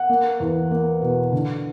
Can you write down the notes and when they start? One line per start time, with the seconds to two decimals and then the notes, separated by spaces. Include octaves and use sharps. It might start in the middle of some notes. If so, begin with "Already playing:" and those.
Already playing: F#5
0.09 A#3
0.40 E2
0.71 A#3
1.02 B2
1.33 D3